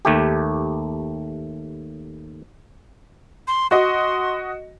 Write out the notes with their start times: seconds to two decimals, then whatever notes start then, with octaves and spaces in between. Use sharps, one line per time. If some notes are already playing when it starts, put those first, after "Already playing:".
0.05 D#2 A3 G4
3.48 C6
3.71 F#4 D#5 C6